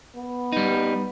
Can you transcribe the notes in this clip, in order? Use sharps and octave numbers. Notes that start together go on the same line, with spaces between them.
B3
G3 D#4